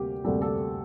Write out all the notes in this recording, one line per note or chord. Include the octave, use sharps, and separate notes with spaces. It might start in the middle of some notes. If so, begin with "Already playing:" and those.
Already playing: D2 C3 G3 A#3 G4
D2 C3 G3 A#3 A4
A4